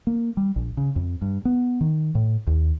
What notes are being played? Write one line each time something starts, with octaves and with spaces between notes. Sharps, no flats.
A#3
G3
A#1
C#3
F2
G2
B3
D#3
A2
D#2